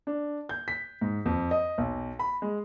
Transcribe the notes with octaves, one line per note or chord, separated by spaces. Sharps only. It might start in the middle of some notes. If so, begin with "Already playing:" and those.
D4
G6
B6
G#2
F2
D#5
B1
B5
G#3